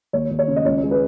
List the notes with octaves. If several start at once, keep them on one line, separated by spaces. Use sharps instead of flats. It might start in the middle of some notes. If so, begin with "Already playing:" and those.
D#2 C#5
D#2
C#5
C#3
D#5
C#2 C#5
G#3
B4